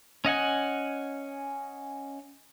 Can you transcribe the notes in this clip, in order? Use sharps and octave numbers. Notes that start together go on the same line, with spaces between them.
C#4 D#5 F#5 G#5